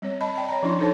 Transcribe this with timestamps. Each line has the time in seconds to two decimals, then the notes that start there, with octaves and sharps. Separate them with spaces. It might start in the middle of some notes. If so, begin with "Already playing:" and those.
0.02 G3 C4 C#5
0.21 D#5 A5 B5
0.35 D5 G5 A5
0.49 C#5 D#5 A#5
0.63 F3 C#4 D4 E4 C#5 C6
0.79 D#4 E4 A4 C5 C#5 A5